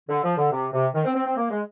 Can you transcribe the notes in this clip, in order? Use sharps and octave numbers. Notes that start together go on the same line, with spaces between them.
D3
F3
D3
C3
C3
D#3
C4
C4
C4
A#3
G#3